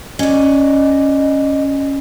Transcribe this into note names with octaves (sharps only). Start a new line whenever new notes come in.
C#4 D5 D#5